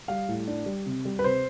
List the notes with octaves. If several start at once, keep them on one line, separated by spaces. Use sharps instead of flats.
G3 F5
A2
D4
G3
C3
G3
B4
C3 C5